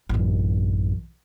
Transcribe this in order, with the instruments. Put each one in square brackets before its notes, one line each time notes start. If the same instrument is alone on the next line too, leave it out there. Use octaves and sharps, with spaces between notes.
[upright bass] A1 F#2